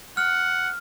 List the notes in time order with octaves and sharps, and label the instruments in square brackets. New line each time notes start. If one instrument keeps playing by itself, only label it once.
[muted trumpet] F#5 [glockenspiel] F6